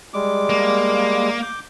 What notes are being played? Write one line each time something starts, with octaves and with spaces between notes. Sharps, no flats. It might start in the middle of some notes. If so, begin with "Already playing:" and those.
G3 G#3 D6
A#3
D6 G6